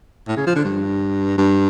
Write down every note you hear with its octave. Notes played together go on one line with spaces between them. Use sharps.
A2
C#3
F3
D3
G2
G2